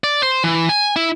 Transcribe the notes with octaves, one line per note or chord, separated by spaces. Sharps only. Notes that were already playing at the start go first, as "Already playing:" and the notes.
D5
C5
E3
G#5
E4